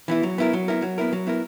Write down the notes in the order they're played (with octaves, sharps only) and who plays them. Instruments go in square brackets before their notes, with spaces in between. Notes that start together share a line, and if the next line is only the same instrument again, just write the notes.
[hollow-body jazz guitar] E3 B3 E4
F#3
B3 E4 A#4
F#3
B3 E4 A#4
F#3
B3 E4 A#4
F#3
B3 E4 A#4